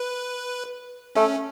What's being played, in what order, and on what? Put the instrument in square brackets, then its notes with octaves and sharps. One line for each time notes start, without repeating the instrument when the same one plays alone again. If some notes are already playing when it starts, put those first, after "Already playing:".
Already playing: [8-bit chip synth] B4
[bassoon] A3 [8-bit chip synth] C#4